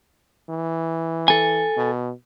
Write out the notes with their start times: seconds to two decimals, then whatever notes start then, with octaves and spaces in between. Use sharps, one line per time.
0.50 E3
1.28 A4 G#5
1.77 B2